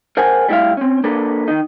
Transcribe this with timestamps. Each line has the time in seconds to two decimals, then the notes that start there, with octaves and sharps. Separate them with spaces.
0.17 A#4 C5 F#5 G#5
0.49 G3 A3 E4 D5 E5 F5
0.77 C4 C#4
1.04 A#3 D4 A4 B4
1.48 D#3 D#4